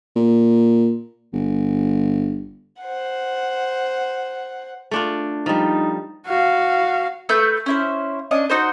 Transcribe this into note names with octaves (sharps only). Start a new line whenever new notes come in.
A#2
G1
C5 F#5
A3 D4 F4
F3 G3 D#4
F#4 F5
A3 B4 E6 G6
C#4 E4 C5
C#4 D4 D#5
D#4 F#4 C5